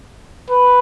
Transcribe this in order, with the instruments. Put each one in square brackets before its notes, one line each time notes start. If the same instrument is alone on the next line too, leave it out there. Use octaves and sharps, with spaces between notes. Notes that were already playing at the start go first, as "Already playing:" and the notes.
[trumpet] B4